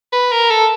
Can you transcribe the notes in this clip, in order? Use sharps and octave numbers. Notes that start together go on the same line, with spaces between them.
B4
A#4
A4